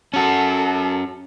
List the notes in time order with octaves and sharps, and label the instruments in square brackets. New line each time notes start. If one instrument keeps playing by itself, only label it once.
[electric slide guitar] C#4 F#4 [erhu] A4